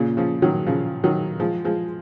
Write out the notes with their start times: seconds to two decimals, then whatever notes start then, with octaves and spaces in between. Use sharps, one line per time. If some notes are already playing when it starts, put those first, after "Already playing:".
Already playing: A#2 C#3
0.17 C#3 F3
0.42 D#3 F#3
0.66 C#3 F3
1.04 D#3 F#3
1.40 F3 G#3
1.64 F3 G#3